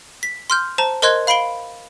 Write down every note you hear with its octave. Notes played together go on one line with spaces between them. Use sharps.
B6
C6 F6 G6
C5 A5 A#5
A#4 C5 D#5 C6 F#6 G#6
F5 B5 C7 D7 G7